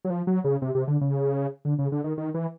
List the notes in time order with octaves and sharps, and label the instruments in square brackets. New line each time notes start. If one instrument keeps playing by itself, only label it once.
[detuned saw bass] F#3
F3
F#3
C#3
C3
C3
D3
C#3
D3
C#3
D3
D#3
D#3
E3